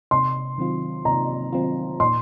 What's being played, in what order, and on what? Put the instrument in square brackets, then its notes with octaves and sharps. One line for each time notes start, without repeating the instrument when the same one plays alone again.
[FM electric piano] C3 [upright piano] C6
[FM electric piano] D#3 F#3 C4 F4
[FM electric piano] C3 [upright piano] A#5
[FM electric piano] D#3 F#3 C4 F4
[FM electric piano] A#2 [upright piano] C6